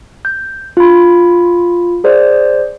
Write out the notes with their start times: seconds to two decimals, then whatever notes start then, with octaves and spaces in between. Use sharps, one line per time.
0.25 G6
0.77 F4 B5
2.04 G#4 C5 D5